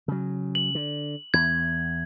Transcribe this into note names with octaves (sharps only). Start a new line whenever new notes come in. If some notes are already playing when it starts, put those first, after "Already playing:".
C#3 F#3
F#7
D3
E2 G#6